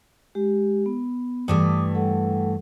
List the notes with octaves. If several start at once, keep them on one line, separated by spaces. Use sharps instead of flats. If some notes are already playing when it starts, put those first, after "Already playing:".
G#3 G4
B3
G2 E3 A3 D6 D#6
G3 A4 F#5